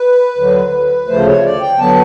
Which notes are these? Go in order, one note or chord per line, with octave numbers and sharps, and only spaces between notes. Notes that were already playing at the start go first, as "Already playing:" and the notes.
Already playing: B4
D2 D3 F#3
D2 C#3 F3 A3 C5
C#5
D5
G5
D3 F#3 B3 A5